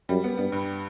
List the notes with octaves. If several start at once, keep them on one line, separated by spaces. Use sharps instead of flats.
F#2 G3
B3
G2 B3
G2